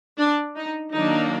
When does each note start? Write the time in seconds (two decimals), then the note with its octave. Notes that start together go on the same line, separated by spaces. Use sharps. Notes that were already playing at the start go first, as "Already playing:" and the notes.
0.18 D4
0.57 D#4
0.95 D#3 F#3 A#3 D4 D#4